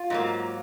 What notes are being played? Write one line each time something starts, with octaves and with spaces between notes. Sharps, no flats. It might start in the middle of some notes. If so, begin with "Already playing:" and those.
Already playing: F4
G#2 F#3 A#3